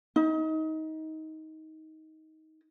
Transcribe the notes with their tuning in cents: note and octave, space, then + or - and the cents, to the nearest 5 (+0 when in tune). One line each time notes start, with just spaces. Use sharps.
D#4 +20